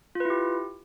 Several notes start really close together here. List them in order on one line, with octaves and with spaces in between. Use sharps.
F4 B4 E4 G4